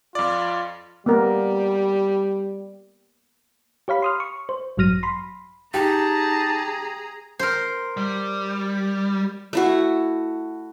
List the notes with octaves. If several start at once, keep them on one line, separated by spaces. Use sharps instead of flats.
F2 F4 D5
G3 A#3 B3 A#4
G4 C#5 F5 B5
C6 D#6 F6
C#6
C5
A1 G2 F#3 F6 A#6 D#7
B5 C6
D#4 G4 G#4 A5 A#5
A#4 C5
G3
A3 E4 F#4